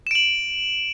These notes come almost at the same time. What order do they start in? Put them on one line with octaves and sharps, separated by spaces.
E7 D7 F#7